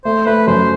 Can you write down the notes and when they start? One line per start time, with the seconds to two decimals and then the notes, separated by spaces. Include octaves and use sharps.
0.05 A3 C5
0.26 A3 B4
0.47 F#2 C5